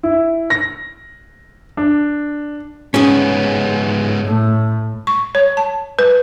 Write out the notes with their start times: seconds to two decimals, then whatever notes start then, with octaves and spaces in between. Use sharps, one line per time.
0.03 E4
0.50 A#6
1.77 D4
2.94 G#2 B3 C#4 G#4
4.26 A2 A3
5.07 C#6
5.35 C#5
5.57 A5
5.99 B4